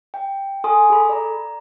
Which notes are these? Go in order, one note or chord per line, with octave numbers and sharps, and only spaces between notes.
G5
A4 G#5 C6 D#6
G#4 A4 B5
D5 A#5